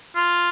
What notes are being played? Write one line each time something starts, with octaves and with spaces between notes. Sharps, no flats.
F4